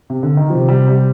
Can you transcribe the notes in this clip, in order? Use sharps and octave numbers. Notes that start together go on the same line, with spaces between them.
C3
D3
D#3
C3 F3
G3
G3